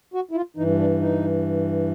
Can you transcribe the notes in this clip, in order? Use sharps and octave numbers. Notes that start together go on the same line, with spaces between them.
F#4
E4
F4
G2 E3 D#4
D4
D#4